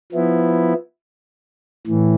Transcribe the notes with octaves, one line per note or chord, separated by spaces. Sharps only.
F3 B3 E4
A2 E3